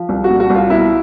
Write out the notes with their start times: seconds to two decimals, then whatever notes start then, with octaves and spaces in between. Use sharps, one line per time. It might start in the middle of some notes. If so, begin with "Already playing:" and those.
Already playing: F3
0.09 C2
0.24 F#4
0.30 A#2
0.40 F#4
0.50 C2
0.55 F4
0.70 B2 E4